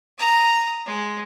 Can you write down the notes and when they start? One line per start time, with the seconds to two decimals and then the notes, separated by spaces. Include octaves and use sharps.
0.18 A#5 D#6
0.86 G#3